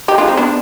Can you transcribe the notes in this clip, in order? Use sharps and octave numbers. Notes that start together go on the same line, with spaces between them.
D#4 G4
D4 F4
C4 D#4
B3 D4